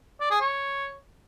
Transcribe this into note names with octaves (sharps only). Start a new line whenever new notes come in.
D5
G#4
C#5